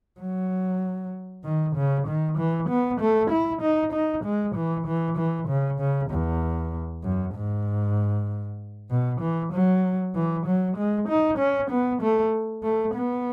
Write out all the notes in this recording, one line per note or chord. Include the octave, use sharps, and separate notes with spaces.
F#3
D#3
C#3
D#3
E3
B3
A3
E4
D#4
D#4
G#3
E3
E3
E3
C#3
C#3
E2
F#2
G#2
B2
E3
F#3
E3
F#3
G#3
D#4
C#4
B3
A3
A3
B3